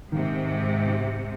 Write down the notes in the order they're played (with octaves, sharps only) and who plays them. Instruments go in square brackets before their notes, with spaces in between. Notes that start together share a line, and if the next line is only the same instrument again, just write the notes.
[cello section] G#2 C3 [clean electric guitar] D#3